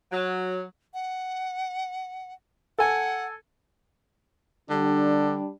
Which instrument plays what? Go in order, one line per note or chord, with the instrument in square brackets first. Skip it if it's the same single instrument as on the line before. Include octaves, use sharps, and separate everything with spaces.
[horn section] F#3
[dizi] F#5
[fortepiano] A4 G#5 [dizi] F#5
[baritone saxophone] D3 [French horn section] G3 D4